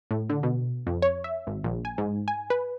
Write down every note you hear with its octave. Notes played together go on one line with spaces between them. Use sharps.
A2
D3
B2
F2
C#5
E5
G#1
A#1
G#5
G#2
G#5
B4